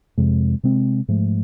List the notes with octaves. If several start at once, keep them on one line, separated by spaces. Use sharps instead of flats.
F2 C3 G#3
C3 G#3 C4
G#2 F3 A3